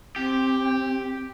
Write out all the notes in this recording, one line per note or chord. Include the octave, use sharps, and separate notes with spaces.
C4 G4